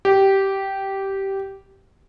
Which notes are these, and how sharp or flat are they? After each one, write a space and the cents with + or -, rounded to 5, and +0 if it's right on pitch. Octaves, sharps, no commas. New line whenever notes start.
G4 -10